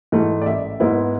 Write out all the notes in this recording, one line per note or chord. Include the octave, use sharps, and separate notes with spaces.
G#2 E3 A3
D5
A1 E5
G#2 G#3 B3 E4